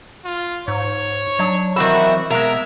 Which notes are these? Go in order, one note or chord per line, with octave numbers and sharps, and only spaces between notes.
F4
G#2 C#5
F#3 D4
D#3 E3 C4 F#4 B4 E5
B2 G#3 A#4 E5 F5